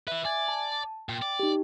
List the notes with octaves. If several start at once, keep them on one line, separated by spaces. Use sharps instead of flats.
E4 B4 E5
D5 G#5 G#6
A5
A#2 G5
D5
D#4 G4